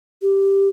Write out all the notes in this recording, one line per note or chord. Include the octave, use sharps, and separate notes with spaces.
G4